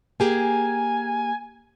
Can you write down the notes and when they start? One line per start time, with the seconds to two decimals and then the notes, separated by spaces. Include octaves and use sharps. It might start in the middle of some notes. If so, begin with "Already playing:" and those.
0.20 A#3 G4 G#4 G#5